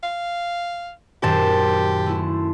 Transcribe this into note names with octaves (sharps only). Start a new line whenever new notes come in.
F5
F#2 A#2 D#3 G4 C5 A5
A3 C#4 E4